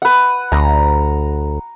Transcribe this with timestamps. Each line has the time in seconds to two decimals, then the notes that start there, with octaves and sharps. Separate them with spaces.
0.02 B4 F#5
0.52 D2 A#5